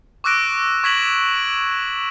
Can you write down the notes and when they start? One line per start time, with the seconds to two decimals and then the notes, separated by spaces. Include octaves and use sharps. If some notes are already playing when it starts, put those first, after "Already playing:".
0.24 C#6 D6 E6 F#6 A#6 D7
0.84 C#6 G#6 A#6 B6 E7 F#7
1.35 D7